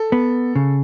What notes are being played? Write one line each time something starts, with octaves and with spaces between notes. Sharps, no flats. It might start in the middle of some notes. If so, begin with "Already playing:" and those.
Already playing: A4
B3
C#3